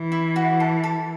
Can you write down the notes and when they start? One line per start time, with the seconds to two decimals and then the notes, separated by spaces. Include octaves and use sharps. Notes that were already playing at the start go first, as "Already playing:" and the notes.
Already playing: E3
0.12 E4
0.36 F#4
0.60 A4
0.84 A4